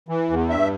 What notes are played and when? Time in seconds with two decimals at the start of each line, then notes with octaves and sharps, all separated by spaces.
0.09 E3
0.30 E2
0.49 G2 E5